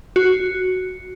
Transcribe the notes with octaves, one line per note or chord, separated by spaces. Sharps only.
F#4